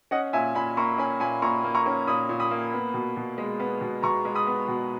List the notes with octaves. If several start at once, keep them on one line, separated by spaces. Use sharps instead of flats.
C#4 D#5 F#5
A#2 E5 G#5
A#2 G#5 B5
A#3 A#5 C#6
C#4 G#5 B5
A#2 G#5 B5
A#2 A#5 C#6
A#3
A#5 C#6
C#4
A#2 B5 D#6
A#2
B5 D#6
A#3
B3
B2
B2
G#3
B3
B2
B2 A#5 C#6
G#3
B5 D#6
B3
B2